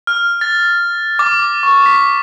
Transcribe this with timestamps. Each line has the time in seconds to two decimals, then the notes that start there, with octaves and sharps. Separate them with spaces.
0.07 F6
0.41 A6
1.19 D6
1.63 C#6
1.86 B6